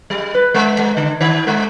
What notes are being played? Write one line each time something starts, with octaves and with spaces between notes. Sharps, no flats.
G3
B4
G#3
G#3
D3
D#3
G#3